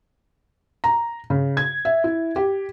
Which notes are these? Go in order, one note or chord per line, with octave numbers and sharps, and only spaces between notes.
A#5
C#3
G#6
E5
E4
G4